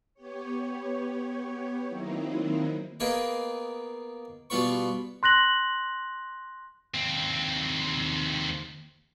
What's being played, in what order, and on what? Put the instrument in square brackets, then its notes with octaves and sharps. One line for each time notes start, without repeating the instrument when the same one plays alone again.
[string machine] B3 G4 C#5
D#3 F#3 A#3 C4 D#4 E4
[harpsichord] A#3 B3 G#4 D#5 G5
B2 G3 B3 F4 B4 C#6
[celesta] C6 F#6 A#6 F#7
[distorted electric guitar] D#2 C4